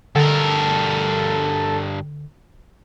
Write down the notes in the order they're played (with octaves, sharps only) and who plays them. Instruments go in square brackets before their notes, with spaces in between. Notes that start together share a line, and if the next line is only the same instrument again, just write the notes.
[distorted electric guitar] G2 A#4 [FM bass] D3 [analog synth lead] A4